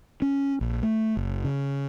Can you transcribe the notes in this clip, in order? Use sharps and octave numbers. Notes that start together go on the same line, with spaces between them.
C#4
A#1
A3
F#1
C#3